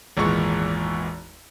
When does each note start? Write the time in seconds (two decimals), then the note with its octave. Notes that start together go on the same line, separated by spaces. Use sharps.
0.17 G#1 E2 A#2 E3 G#3 C#6